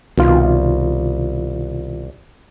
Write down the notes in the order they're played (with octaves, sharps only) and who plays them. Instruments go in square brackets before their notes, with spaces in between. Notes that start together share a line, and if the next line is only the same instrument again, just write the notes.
[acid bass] C2 [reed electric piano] B2 D#3 F4